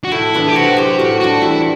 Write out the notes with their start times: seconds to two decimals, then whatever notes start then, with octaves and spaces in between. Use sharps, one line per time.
0.04 F#4
0.12 A2 E4
0.34 E3 B3 D4
0.47 G4
0.55 C3 F#4
0.77 F#3 C4 G4
0.98 A2 F#4
1.20 G3 D4 F#4
1.42 E2 E4